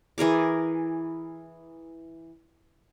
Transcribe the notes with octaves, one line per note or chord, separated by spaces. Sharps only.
E3 G#4 A#4 D6